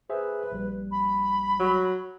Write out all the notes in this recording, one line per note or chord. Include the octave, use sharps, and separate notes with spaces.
G#4 B4 C5 E5
A#1 G3
B5
F#3